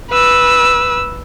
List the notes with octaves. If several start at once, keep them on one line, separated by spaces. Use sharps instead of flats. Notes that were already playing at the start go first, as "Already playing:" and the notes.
B4 E6